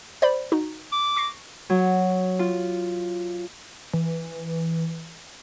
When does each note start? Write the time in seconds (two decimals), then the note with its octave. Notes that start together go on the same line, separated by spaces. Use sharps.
0.22 C5 D5 B5
0.52 D#4 F#4
0.92 D6
1.16 C#6 A#6 C7
1.70 F#3
2.39 F4
3.93 E3